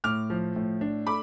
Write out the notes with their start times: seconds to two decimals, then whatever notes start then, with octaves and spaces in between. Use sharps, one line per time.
0.04 A2 D6 F6
0.30 F3
0.56 A2
0.81 D4
1.07 A3 B5 D6